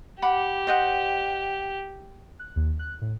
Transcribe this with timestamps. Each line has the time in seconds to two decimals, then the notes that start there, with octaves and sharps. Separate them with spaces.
0.22 G4 F#5 B5 D6
0.67 C5 D#5 F#5
2.39 F#6
2.56 D#2
2.79 F#6
3.02 A2